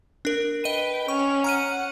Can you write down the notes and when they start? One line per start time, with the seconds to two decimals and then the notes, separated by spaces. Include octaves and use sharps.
0.25 D4 A#4
0.64 B4 D#5 G5 D#7
1.08 C#4 C#6
1.44 F#5 A#5 F6 D#7